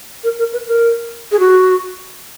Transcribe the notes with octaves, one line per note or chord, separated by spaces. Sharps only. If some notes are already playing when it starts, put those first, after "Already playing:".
A#4
A#4
B4
A#4
G#4
F#4